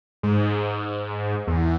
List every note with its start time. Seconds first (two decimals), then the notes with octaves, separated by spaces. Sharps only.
0.23 G#2
1.47 E2